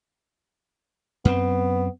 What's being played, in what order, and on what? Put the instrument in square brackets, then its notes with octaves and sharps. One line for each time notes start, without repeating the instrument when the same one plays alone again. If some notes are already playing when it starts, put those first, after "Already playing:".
[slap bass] F#2 C4 [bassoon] B3